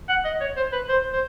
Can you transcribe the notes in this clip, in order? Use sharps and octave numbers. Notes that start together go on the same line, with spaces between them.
F#5
D#5
C#5
C5
B4
C5
C5